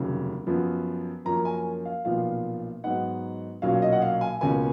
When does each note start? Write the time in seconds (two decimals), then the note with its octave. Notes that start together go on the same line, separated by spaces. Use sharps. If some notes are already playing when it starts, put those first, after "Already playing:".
Already playing: F1 D#2 C#3 F#3
0.47 F#2 F3 B3
1.25 F#2 F3 A#3 C#4 A#5
1.45 G#5
1.85 F5
2.05 B1 A#2 F3 B3 F5
2.84 G#2 F#3 B3 D#4 F#5
3.62 B1 A#2 F#3 C#4 F5
3.82 D#5
3.92 F#5
4.02 F5
4.21 G#5
4.41 C#2 B2 A#3 C#4 G#5